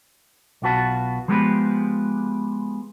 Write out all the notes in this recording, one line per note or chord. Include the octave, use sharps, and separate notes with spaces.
B1 B2 F4 F#4 B4 A5
F3 G#3 B3 G4 A4 B4